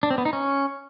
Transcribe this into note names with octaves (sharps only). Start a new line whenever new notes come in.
D4
C4
B3
D#4
C#4